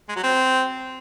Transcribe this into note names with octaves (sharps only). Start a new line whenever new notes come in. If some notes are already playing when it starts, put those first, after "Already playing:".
G#3
F#3
C4